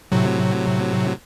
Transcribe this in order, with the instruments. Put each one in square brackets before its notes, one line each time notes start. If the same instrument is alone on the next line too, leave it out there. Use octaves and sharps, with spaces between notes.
[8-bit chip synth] A2 C3 F#3